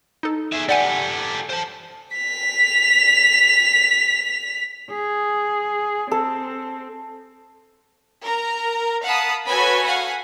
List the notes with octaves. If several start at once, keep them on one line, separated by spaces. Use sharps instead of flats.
D#4 A4
G#4 E5
G4 A4 D5 F#5 G#5
C5 A5
B6 F7
G#4
C4 A4
A#4 A#5
F5 F#5 A5 B5 D#6
F#4 A4 B4 C#5 G#5 B5
F5 F#5 G#5 B5